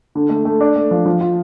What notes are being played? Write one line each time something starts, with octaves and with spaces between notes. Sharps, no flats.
D3
A3
A3
D4
A3
F3
F3
F4